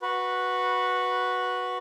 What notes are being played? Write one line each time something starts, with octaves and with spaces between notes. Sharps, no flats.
F#4 B4